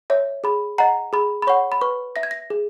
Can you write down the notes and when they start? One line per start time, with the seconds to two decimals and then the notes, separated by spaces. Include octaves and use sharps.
0.10 C#5 E5
0.44 G#4 B5
0.78 D#5 F#5 A#5
1.13 G#4 B5
1.42 B5
1.47 C#5 F#5 C#6
1.72 B5
1.81 B4 C#6
2.16 E5 A#6
2.23 G#6
2.31 A#6
2.50 G#4